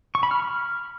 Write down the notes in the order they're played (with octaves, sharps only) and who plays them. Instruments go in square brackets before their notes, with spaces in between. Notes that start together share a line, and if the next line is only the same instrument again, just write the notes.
[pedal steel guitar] C#6
B5
F6